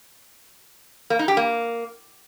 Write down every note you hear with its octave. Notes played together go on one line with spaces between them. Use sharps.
A#3
D#4
G4
A#3